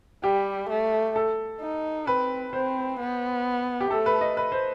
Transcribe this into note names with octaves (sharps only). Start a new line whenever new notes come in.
G3 G4
A3
A4
D#4
C4 B4
C4 C5
B3
G4
A3 A4
B4
D#5
B4
C5